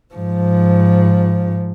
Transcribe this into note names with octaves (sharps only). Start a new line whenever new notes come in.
G#2 F3